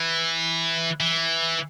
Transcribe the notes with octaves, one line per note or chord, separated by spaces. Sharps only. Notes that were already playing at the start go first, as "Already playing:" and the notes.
Already playing: E3
E3